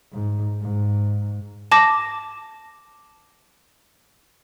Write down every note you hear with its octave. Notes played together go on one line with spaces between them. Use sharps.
G#2
G#2
A5 D6 A#6